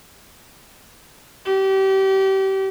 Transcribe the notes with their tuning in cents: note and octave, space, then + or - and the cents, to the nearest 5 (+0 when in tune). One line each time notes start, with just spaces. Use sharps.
G4 -30